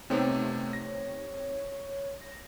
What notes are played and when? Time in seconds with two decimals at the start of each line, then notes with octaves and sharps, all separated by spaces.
0.10 C3 A3 B3 C4 D#4 G4 C#5
0.73 A#6
2.21 A#6